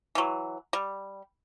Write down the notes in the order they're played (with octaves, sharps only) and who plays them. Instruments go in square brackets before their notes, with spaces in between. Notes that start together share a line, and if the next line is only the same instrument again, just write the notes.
[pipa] E3 F#3
G3